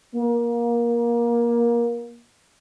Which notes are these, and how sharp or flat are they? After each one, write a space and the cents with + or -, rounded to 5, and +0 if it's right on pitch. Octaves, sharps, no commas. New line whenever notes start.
A#3 +20